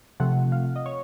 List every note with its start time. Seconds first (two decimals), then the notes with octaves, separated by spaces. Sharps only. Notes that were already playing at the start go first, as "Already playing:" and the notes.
0.20 C3 F3 A3 F#5
0.52 F5
0.76 D#5
0.86 C#5